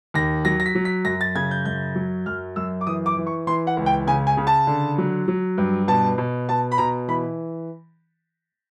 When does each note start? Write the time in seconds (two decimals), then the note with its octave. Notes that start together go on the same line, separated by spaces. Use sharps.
0.14 D#2 A#6
0.45 F#3 A#6
0.60 A#6
0.66 B6
0.75 F#3
0.85 B6
1.05 F#2 A#6
1.21 A6
1.35 C#3 G#6
1.51 G6
1.65 F#2 G6
1.95 F#3
2.26 F#2 F6
2.56 F#2 E6
2.81 D6
2.87 E3 D#6
3.06 D6
3.17 E3
3.27 C#6
3.47 E3 C6
3.67 F#5
3.77 C#2
3.86 G5
4.07 C#3 G#5
4.27 G#5
4.37 C#3
4.47 A5
4.67 D3
4.98 F#3
5.28 F#3
5.58 G2
5.88 B2 A5
6.18 B2
6.49 B2 A5
6.72 B5
6.78 B2 A#5
7.08 E3 B5